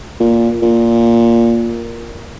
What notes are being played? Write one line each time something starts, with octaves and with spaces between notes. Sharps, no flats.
A#2
A#2